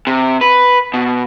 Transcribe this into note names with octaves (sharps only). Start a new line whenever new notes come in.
C3
B4
B2